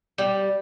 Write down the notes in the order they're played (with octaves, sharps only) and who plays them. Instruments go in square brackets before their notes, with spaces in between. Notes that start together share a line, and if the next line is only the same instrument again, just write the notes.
[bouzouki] G3